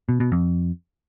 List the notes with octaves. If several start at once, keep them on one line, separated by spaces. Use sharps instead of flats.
B2
B2
F2